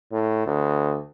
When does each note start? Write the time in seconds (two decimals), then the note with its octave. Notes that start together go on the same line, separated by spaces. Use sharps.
0.12 A2
0.46 D2